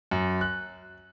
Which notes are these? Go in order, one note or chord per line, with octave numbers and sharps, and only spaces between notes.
F#2
F#6